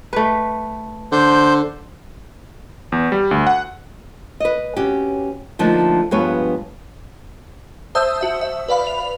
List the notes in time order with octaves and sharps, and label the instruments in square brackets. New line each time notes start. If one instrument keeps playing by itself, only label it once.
[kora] A3 B4
[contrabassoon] D3 [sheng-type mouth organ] C5 G6
[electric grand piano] E2
G3
D2
F#5
[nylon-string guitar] B4 D#5
C3 C#4 F#4 G4
D3 F3 A3 A#3 D4 D#4
G2 F3 G#3 B3 B4 C#5
[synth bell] C5 E5 A5 D#6 E6 G6
F#4 E5
E5
B4 D5 F5 B5
F7